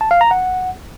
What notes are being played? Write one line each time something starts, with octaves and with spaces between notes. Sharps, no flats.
A5
F5
A#5
F#5